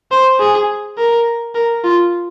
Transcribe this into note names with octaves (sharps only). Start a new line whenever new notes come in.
C5
G#4
A#4
A#4
F4